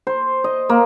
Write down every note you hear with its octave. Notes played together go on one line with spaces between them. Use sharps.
C5
D#5
A#3